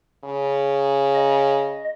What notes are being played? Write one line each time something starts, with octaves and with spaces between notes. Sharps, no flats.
C#3
D#5